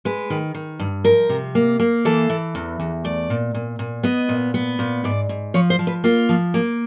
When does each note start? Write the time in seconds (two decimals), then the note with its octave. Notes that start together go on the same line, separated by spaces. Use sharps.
0.05 G#3 B4
0.30 D#3
0.55 D#3
0.79 G2
1.05 F3 A#4
1.29 C3
1.55 A#3
1.79 A#3
2.05 E3 A4
2.30 E3
2.55 E2
2.80 E2
3.04 A3 D5
3.30 A#2
3.54 A#2
3.79 A#2
4.03 B3 D#5
4.29 A#2
4.54 B3
4.79 A#2
5.04 G#2 D5
5.29 G#2
5.54 F3 C#5
5.70 C5
5.79 F3
5.87 B4
6.04 A#3 F4
6.29 F3
6.54 A#3